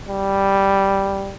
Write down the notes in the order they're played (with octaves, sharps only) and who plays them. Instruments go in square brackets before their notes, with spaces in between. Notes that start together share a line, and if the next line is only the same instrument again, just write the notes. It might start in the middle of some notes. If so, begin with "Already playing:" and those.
[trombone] G3